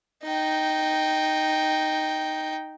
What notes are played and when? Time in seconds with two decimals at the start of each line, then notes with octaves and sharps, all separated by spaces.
0.24 D#4 G5